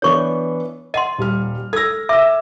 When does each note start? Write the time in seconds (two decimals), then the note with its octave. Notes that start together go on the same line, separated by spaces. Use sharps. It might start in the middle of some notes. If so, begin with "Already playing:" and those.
0.02 E3 B3 D4 C#5 C#6 D6
0.94 D#5 F#5 C6 D#7
1.18 D#1 G3 F6
1.73 A4 E6 G#6 A#6
2.09 E5 D6 E6